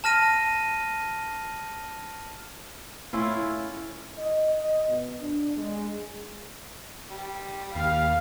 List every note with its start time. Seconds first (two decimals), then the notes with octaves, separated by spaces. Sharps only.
0.04 A5 F6 A#6 D#7
3.13 A2 C#4 E4 F4
4.18 D#5
4.55 D#5
4.89 B2
5.21 D4
5.57 G#3
7.10 G3
7.75 D#2 F5